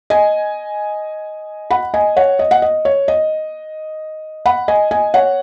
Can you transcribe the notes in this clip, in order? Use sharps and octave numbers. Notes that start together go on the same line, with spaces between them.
D#5 G#5
F#5 B5
D#5 G#5
C#5 F#5
D#5
F#5
D#5
C#5
D#5
F#5 B5
D#5 G#5
D#5 G#5
C#5 F#5